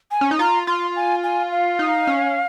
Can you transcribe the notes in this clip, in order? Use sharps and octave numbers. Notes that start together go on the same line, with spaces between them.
G#5
C#4
D#4
F4 A#5
F4 C6
G#5
G#5
F5
D#4
C#4